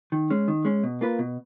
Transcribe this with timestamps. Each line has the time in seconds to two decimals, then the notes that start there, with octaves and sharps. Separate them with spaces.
0.12 D#3
0.30 G#3 C#4
0.48 D#3
0.65 G#3 C#4
0.84 B2
1.01 A#3 F4 B4
1.19 B2